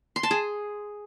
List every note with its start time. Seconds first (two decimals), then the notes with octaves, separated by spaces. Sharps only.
0.16 C6
0.23 A5
0.31 G#4